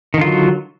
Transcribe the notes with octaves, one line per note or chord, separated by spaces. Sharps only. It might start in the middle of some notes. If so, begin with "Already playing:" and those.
D3 D#3 F#3 F4